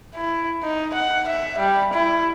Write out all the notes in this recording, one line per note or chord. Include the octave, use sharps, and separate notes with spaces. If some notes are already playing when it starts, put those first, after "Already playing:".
E4
D#4
F#5
E5
G3
E4